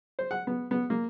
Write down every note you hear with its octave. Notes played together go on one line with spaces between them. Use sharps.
C5
F#5
B3
B3
A#3